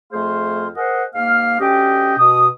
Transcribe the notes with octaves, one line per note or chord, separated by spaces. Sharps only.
F2 A3 G#4 C5 F5 C6
G#4 A#4 C5 D#5 F#5
G#2 A#3 F5 F6
D2 C#4 G4 D#5 G5
B2 D#6